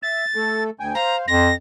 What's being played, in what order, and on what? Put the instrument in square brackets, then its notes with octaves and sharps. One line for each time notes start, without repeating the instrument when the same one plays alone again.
[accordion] E5 [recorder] A6
[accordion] A3 A4
D2 G5 G#5
[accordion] C5 F5 [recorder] A#5
[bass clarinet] F2 [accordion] C6 [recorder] A#6